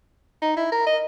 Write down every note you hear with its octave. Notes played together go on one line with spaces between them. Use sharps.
D#4
E4
A#4
D#5